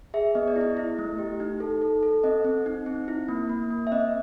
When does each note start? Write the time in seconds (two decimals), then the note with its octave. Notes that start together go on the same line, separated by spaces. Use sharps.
0.14 G#4 E5
0.35 B3 D#5
0.48 D5
0.56 E4
0.61 D#5
0.77 E4
0.98 A3
1.18 G4
1.40 D#4
1.60 A4
1.82 A4
2.03 A4
2.24 C4 D#5
2.44 C4
2.66 D#4
2.86 C4
3.08 E4
3.28 A#3
3.49 A#3
3.70 A#3
3.87 E5
3.92 C4 D#5